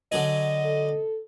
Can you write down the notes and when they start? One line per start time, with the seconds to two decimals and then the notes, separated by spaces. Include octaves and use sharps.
0.12 D3 F#3 G#4 D#5
0.64 A4